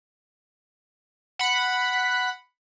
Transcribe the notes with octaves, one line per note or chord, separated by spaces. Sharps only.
F#5 B5